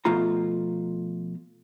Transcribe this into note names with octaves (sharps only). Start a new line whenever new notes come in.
B2 F3 A3 F4 A#5